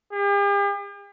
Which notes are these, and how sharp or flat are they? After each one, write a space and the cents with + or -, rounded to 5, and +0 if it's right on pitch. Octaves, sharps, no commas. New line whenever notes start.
G4 +45